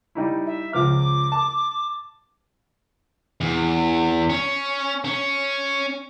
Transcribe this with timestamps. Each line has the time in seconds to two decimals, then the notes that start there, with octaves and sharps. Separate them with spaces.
0.15 G3 D#4 E4
0.46 E5
0.73 C#2 F3 D6 F6
1.32 A5
3.41 E2
4.30 C#4
5.05 C#4